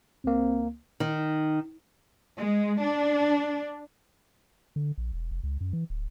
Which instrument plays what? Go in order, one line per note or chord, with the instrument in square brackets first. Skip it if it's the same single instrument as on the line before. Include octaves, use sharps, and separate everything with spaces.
[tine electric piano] C#2 A#3 [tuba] C4
[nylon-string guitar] D#3
[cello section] G#3
D4
[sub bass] D3
A#1
E1
F1
C#2
F#2
E3
D1